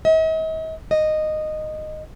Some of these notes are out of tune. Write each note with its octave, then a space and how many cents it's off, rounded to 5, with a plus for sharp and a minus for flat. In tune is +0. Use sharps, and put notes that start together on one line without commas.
D#5 +45
D#5 -10